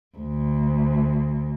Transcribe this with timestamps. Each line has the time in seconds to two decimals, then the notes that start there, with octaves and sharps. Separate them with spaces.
0.17 D2